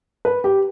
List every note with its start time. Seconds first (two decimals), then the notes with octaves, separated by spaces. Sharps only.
0.25 B4
0.44 G4